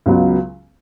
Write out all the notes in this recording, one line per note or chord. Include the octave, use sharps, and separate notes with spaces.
C#2 C#3 F#3 B3